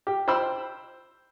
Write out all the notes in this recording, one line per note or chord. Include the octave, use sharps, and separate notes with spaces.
G4
C5 G5 B5 E6